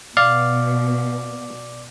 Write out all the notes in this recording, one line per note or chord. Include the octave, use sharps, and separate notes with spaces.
B2 D5 F5